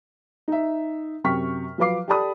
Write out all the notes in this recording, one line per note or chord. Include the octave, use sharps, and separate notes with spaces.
D#4 E5
F#2 C3 G5 C#6 F6 B6
F3 F#3 B4 F5 D6 C7
G4 A4 D5 A5 B5 D#6